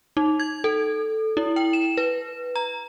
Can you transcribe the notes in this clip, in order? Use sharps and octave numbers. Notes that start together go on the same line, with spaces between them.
D#4
G#6
A4
E4
G5
E7
B4
A#5